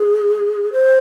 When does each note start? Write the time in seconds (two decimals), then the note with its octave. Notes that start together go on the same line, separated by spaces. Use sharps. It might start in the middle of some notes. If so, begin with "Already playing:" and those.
Already playing: G#4
0.72 C5